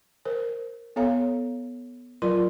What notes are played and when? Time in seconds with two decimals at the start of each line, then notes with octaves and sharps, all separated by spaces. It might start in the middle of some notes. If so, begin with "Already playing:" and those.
0.25 A#4 C5
0.96 B3 A4 C#5 F5 A#5
2.22 F#3 F4 A#4 D5 C6